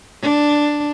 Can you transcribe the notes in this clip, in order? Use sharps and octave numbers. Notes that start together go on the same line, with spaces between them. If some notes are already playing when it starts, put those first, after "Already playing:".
D4